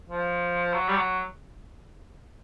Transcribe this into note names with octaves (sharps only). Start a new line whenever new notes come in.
F3
F#3
G3
F#3